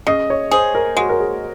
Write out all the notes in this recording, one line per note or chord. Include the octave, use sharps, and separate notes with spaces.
C#3 D#5
C#5
G#4 C5
A#4
G#3 F#4
A#4
G#4